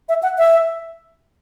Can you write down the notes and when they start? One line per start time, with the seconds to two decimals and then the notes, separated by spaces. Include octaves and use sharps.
0.09 E5
0.23 F#5
0.38 E5